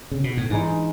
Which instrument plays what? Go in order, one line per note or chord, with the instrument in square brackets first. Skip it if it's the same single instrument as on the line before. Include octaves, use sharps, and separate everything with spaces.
[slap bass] C#3
B2
A2
[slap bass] G#2 [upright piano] E3 G#3 D#4